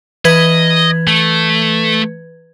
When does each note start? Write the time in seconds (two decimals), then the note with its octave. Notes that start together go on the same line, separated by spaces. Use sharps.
0.25 E3 B4 D#5 G#6
1.07 A3